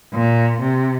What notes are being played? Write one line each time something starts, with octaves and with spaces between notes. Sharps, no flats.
A#2
C3